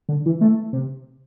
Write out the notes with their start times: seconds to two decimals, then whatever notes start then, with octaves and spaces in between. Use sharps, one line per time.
0.09 D3
0.26 E3
0.41 A3
0.73 C3